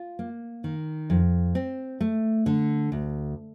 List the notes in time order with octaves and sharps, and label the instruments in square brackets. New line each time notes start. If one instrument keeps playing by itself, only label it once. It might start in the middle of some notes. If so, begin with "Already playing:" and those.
Already playing: [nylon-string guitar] F4
A#3
D#3
F2
C4
A3
D3
D2